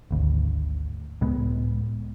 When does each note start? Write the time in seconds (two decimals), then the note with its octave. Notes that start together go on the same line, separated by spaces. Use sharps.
0.11 G#1 D2
1.21 C#2 A2 G#3 B3